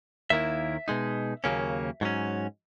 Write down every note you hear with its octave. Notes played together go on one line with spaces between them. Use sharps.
D#2 D#3 A#3 E4 E5
B2 G#3 D#4
D#2 C#3 F#3 A#3 C#4
G#2 F#3 C#4